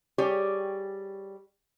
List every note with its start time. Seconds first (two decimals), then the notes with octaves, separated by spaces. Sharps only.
0.18 G3 G4 G#4 C#5